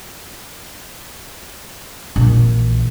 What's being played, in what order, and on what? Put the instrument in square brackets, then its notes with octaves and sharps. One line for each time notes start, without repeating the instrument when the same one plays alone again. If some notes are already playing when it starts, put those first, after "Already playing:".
[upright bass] A#1 E3